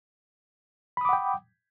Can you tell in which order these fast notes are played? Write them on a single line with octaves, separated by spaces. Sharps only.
B5 D#6 D6 F#5 G5